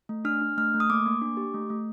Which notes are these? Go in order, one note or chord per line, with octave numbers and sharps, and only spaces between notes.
A3
D4 F6
D4
A3 F6
A3
D#6
A#3 D6
A#3
D4
G4
A3
A3